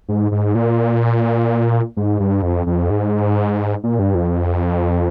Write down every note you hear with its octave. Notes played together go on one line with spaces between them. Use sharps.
G#2
G#2
A#2
G#2
G2
F2
F2
G#2
A#2
G2
F2